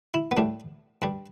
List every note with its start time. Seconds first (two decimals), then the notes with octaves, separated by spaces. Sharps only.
0.14 E4
0.31 B3
0.37 A2 G3 D4
1.02 G2 G3